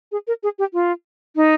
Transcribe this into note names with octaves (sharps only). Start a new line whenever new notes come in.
G#4
A#4
G#4
G4
F4
D#4